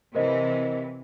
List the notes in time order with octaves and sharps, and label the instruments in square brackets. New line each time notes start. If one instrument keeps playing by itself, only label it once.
[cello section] C3 E3 [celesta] A#4 C5 D#5